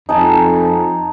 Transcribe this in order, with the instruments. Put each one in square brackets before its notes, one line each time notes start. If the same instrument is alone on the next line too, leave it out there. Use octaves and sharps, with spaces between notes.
[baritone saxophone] F2 [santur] D#4 G#5 A5